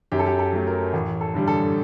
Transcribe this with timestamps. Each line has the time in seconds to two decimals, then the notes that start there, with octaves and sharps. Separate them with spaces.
0.12 F#2 G4
0.19 A4
0.27 G4
0.39 A4
0.53 F#3 A3
0.67 A#4
0.93 A1
1.21 A4
1.34 G2 D3 G3
1.48 A4